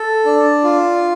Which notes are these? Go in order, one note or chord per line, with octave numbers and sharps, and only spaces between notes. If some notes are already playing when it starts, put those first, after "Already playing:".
Already playing: A4
D4
F4